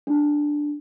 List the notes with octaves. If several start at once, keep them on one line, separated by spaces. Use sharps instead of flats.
D4